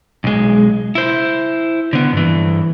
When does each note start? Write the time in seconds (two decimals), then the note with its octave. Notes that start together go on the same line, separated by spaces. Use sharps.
0.24 B1 G#3
0.95 E4 C5
1.93 D3 B3
2.13 G2 E3